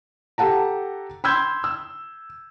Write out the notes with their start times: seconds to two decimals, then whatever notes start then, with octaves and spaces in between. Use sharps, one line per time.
0.38 G4 A4 F#5 A5 A#5
1.24 B5 C6 E6 G6 G#6
1.64 E6